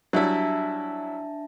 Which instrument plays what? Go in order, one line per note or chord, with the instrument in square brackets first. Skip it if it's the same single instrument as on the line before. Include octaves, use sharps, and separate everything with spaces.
[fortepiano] F#3 G3 E4 [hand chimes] D4 E5 A5